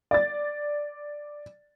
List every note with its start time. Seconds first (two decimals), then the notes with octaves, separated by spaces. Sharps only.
0.11 D5 A6